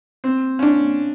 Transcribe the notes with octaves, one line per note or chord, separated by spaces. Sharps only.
C4
C#4
D4